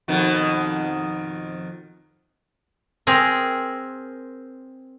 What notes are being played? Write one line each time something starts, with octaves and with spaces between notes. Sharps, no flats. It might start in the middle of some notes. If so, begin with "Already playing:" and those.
F2 B2 D#3
C4 G#4 A#4